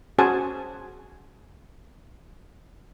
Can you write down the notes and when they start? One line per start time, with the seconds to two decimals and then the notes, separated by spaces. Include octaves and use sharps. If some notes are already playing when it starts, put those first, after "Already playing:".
0.18 C#4 F#4 G#4 C5 G#5 A5